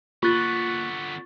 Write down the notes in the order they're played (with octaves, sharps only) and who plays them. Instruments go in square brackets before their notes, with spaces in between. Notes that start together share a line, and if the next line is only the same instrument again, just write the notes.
[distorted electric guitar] D3 B3 [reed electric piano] A#3 F#6 [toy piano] F4 [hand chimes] C#6 A6